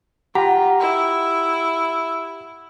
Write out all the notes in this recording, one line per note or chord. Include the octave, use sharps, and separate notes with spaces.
F4 G4 F#5 A#5
E4